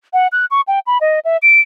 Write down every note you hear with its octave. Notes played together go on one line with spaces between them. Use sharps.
F#5
F#6
C#6
G5
B5
D#5
E5
D7